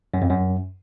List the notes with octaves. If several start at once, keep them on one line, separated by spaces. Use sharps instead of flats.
F#2
F2
F#2